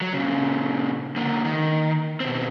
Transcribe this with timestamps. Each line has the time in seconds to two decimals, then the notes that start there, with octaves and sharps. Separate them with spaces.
0.01 F#3
0.13 A#2 C#3
1.16 D3 A#3
1.45 D#3
2.20 B2 C4